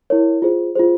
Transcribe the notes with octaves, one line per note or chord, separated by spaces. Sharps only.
E4 A#4 C#5
F4 G#4 C5
F4 G#4 C5